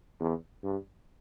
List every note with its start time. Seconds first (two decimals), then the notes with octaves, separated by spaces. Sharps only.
0.20 E2
0.63 G2